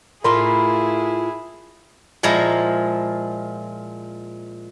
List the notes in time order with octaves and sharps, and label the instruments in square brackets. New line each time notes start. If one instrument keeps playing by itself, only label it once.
[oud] A2 F4 A#4 [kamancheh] E4 G#4 [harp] B5 C6
[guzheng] A#2 F3 G#3 E4 A#5